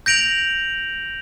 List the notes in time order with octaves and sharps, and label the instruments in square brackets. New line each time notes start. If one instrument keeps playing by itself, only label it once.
[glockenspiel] G6 A#6 D7 F7 F#7